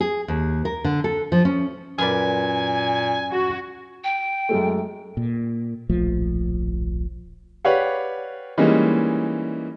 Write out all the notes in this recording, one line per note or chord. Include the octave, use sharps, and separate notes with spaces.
G#4
D#2
A#4
D3
A4
F3
C#4
F#2 A#2 B4 D5 G#5
F#4
G5
F#2 G#3 A3
A#2
D1 A#1 F3 A3
G4 B4 C#5 D5 F5 F#5
E3 G3 G#3 A#3 C#4 D#4